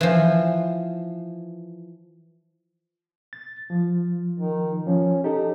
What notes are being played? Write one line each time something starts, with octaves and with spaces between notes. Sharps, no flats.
E3 F3
A6
F3
D#3
F3 C#4
D#4 G4 A4